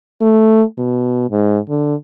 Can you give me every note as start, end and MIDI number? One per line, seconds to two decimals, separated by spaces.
0.21 0.63 57
0.78 1.29 47
1.30 1.59 44
1.69 1.95 50